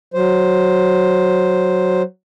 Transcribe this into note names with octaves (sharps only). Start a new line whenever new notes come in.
F#3 C5